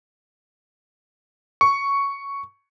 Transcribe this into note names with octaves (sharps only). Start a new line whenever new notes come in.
C#6